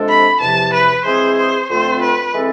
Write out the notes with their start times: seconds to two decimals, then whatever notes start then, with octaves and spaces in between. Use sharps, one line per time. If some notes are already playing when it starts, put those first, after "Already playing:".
Already playing: C3 F3 G#3 D4 A4
0.09 B5
0.41 E2 C3 F3 A5
0.73 B4
1.05 E3 G#3 C4 G#4 C5
1.38 C5
1.70 F2 D3 A3 C4 F4 C5
2.02 B4
2.34 E3 G#3 C4 E4 A4